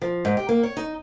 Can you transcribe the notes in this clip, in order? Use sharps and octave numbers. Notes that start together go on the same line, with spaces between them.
F3
G#2
G4
A#3
C#5
D#4